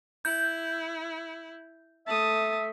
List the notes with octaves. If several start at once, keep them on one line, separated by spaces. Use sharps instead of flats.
E4 G6
A3 E5 A5 D#6